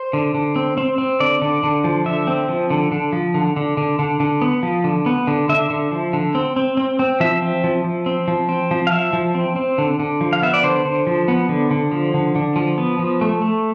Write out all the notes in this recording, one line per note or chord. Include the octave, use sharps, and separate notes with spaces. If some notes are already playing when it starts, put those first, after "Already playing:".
Already playing: C5
D3
D3
C4
C4
C4
D3 D5
D3
D3
F3
D3 E5
C4
F3
D3
D3
F3
D3
D3
D3
D3
D3
B3
F3
D3
B3
D3
D3 E5
D3
F3
D3
C4
C4
C4
C4
F3 E5
C4
F3
F3
C4
F3
C4
F3
F5
F3 E5
F3
C4
C4
D3
D3
F3
F5
B3 E5
D5
D3 C5
D3
F3
B3
D3
D3
F3
D3
D3
F3
B3
F3
A3
A3